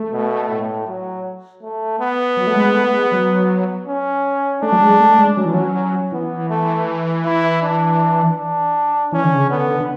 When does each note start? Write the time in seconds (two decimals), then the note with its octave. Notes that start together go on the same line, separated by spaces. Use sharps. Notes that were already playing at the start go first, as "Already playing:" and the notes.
Already playing: A3
0.12 B2
0.50 A2
0.87 F#3
1.62 A3
2.00 B3
2.37 F#3
2.47 A3
2.56 G#3
2.74 A3
2.93 G#3
3.12 F#3
3.87 C#4
4.62 A3 D4
4.72 F#3
4.81 G#3
5.00 A3
5.19 G#3
5.37 F#3 C#4
5.46 E3
5.54 F#3
6.12 E3 B3
6.50 A3
7.25 E4
7.62 D4
8.38 D4
9.12 E3 C#4
9.24 D3
9.35 C#3
9.46 D3 B3
9.80 D3